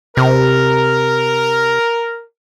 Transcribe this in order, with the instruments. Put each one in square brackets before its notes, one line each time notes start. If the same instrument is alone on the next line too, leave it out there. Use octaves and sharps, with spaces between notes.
[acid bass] C3 [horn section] A#4